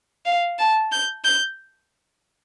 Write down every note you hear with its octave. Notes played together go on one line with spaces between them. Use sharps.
F5
A5
G6
G6